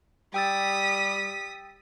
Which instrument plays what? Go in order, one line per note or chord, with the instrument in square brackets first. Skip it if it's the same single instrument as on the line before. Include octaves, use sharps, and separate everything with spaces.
[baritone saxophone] G3 [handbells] G5 E6 A6 [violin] D#6 B6